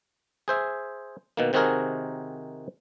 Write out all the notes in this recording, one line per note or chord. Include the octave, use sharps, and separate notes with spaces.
G#4 C5 E5
B2 D#3 A#3
C3 D#3 C4 F#4 G#4 A#4